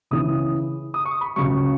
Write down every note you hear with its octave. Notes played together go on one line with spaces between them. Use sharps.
C#2 C#3 E3 D#6
D#6
C#6
B5
C#2 C#3 F#3 C#6